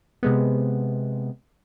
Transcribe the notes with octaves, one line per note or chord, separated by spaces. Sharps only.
C3 G#3 B3